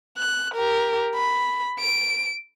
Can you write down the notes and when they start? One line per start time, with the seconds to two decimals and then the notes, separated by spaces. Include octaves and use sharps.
0.17 F#6
0.54 G4 A#4
1.15 B5
1.79 D7